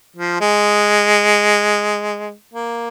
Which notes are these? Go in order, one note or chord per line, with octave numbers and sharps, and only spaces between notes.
F3
G#3
A#3